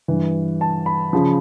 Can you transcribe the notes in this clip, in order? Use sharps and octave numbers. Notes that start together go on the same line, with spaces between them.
G2 E3
A5
B5
C#3 F3